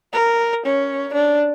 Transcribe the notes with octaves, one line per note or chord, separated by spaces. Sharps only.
A#4
C#4
D4